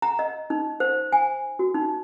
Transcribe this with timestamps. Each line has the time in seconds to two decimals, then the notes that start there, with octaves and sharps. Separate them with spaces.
0.02 A#5
0.19 D#5
0.50 D#4
0.80 C5
1.12 G#5
1.59 F#4
1.74 D#4